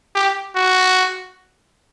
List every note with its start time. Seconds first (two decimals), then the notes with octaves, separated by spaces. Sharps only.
0.15 G4
0.55 F#4